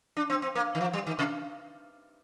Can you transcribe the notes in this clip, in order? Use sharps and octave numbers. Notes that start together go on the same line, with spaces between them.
D4
C4
C4
A#3
D#3
F3
G3
D#3
C3